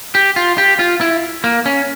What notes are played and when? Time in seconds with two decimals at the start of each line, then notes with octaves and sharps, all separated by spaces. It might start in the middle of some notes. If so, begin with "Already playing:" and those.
0.15 G4
0.36 F4
0.58 G4
0.79 F4
1.01 E4
1.44 A#3
1.66 C#4